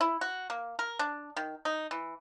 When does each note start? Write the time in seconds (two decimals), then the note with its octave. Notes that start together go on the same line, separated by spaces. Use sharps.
0.01 E4
0.21 F#4
0.50 A#3
0.79 A#4
0.99 D4
1.36 D#3
1.65 D#4
1.91 E3